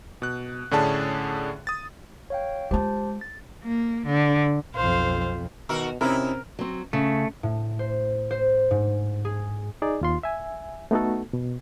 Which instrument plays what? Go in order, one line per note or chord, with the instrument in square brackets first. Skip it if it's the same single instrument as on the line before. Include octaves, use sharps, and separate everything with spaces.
[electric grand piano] B2 F#6
A2 D3 C#4 D4 G#4 A5
D#6 A6
[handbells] C#5 F5 G5
[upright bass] G#3 F4 [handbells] G4 C5 A5
[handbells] A6
[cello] A#3
D3
[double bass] B1 F2 [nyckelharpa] C5 F5
[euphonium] B2 [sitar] D#3 F#4 A#4
[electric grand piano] C3 C#4 [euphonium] C4 [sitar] D#4 E4 [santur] A#4
[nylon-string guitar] F#3 C4
[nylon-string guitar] C#3 [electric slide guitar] A3
[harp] A2
C5
C5
G#2
G#4
[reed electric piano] D#4 G#4 D5
D#2 F4 C6
E5 G#5
A3 B3 D#4 F#4 A4
B2